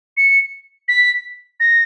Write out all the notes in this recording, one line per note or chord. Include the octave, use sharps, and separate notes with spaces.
C#7
B6
A#6